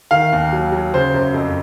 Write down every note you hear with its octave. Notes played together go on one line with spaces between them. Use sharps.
D#3 F5
D#2
F#3
F#3
C#3 C5
F#2
F2